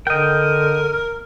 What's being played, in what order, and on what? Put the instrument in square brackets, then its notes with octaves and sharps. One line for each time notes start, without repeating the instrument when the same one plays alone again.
[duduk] D3 [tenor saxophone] A#4 [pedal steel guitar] D#5 G5